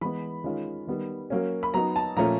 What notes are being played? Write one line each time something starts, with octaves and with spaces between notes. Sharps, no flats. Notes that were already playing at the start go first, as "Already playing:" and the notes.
E3 G#3 B3 B5
D#3 G#3 C#4 F4
D#3 G3 B3
F#3 A#3 C#4
B5
F#3 B3 D#4 A#5
A5
A#2 F3 A3 C#4 A#5